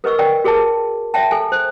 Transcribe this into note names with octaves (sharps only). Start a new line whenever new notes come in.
A#4 B4 D#5 C#6 E6
A#4 D5 G5
F#4 G#4 A#4 C#5 A5
C#5 E5 G5 A5
A4 G#5
C5